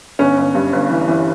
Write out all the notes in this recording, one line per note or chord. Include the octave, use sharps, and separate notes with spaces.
G1 C#4
G1
G2
G1
E3
E3